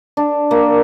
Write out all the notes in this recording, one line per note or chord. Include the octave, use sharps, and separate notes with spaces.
D4
A#3